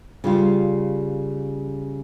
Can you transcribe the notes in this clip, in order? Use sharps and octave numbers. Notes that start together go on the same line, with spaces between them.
C#3 G3 F4